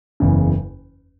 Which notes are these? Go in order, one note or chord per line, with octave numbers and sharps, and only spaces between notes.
F#1 E2 C#3